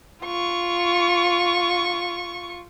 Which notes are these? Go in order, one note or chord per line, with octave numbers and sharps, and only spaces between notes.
F4 C#6